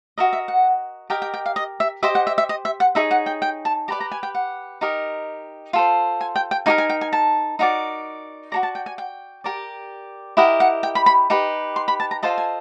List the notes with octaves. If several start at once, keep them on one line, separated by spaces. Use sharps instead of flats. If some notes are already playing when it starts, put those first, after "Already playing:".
F#4 A#4 D#5 E5
E5
F#5
G4 A#4 D#5 G5
G5
G5
F5
D#5
E5
G4 C5 D#5 E5
F#5
E5
E5
D#5
E5
F#5
D#4 G#4 C#5 E5
F#5
G5
G5
A5
G4 B4 D5 A#5
A#5
G#5
G5
F#5
D#4 G4 A#4 D#5
F4 A4 C5
G#5
G5
G5
D#4 G4 A#4 G#5
G#5
G5
G#5
A5
D#4 F#4 A#4 D5
F#4 A4 D5 A#5
A5
G5
G#5
G5
G4 A#4 D5
E4 G4 A#4 D#5 F#5
F#5
G5
B5
B5
D#4 G4 B4
C6
B5
A5
A#5
F4 A4 C5 D#5 A5
G#5